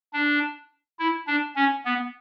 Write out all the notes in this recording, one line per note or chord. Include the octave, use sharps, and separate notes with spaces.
D4
E4
D4
C#4
B3